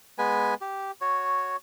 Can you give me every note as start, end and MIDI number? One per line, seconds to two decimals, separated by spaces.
0.18 0.54 56
0.18 0.54 59
0.18 0.54 71
0.18 0.54 80
0.61 0.91 67
1.01 1.56 66
1.01 1.56 73